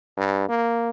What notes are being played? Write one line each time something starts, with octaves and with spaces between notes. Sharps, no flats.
G2
A#3